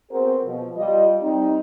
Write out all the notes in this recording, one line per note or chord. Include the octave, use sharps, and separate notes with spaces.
B3 C4 F#4 G#4 A#4 C5
B2 F3
G3 F4 D#5
G3 C4 D#4